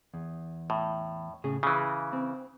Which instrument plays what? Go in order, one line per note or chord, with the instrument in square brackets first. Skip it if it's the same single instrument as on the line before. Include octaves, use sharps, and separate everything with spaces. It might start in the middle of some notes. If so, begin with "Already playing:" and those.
[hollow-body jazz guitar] E2
[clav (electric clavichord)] A2
[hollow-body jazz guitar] A2 C#3 G#4
[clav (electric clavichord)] C#3 E3 [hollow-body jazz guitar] G#4
[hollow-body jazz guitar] C4